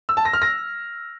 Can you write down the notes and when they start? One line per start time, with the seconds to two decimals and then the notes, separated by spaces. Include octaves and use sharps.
0.09 E6
0.17 A5
0.25 A#6
0.33 F6
0.42 A#6